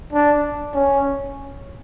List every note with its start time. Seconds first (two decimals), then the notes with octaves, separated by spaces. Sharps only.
0.13 D4
0.74 C#4